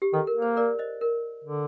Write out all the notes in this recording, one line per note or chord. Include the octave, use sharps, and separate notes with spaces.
G4
D#3 A4
A#4
A#3
C5
A#4 D5
C5 D#5
A#4
D3